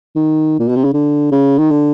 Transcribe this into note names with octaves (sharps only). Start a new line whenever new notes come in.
D#3
A#2
B2
C3
C#3
D3
C#3
D#3
D3